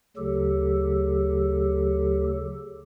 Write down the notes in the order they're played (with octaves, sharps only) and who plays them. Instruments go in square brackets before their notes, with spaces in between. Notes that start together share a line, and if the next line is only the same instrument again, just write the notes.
[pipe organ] D2 C#3 F#3 G4 A4